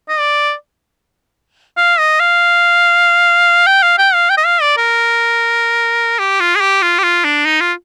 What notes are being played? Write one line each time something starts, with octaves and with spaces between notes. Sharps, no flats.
D#5
D5
F5
D#5
F5
G5
F5
G5
F5
G5
D#5
F5
D5
A#4
G4
F4
G#4
G4
F4
G4
F4
D4
D#4
F4